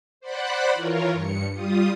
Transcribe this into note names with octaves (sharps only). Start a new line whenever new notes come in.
C5 D5 F#5 B5 F#6
E3 F4 A#4 C#5
G2 C#7
G3 F4 D#6